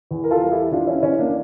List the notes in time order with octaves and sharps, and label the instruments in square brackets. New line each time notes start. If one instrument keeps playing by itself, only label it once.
[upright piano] E2
A#4
F4 A4
G3
E4 G4
E2 D4 F4
C#4 E4
E2 C#4 E4
A#3 D4